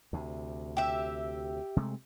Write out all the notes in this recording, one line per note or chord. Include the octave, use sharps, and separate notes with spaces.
D2 C3
G4 E5
C3 G#3 A3